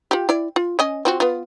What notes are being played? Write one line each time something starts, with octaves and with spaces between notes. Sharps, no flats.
F4 G4
E4 D5
F4
C#4 D#5 G#5
C4 F4 F#4
B3 F4